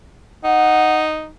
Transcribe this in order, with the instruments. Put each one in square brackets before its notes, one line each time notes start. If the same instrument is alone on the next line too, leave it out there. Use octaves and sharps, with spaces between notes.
[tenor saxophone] D#4 [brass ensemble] F#5